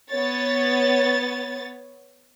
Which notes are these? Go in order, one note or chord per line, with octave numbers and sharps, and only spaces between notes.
B3 C#5 A6